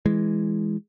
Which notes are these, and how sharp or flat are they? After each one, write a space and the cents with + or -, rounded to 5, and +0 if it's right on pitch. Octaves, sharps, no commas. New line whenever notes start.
E3 +0 G#3 +0